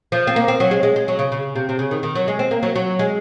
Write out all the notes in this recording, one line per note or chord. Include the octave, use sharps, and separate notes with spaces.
F3
C4
A#3
C4
F#3
G#3
G#3
G#3
F#3
C#3
C#3
C3
C3
C#3
D#3
D#3
F#3
G#3
C4
A#3
F#3
F#3
G#3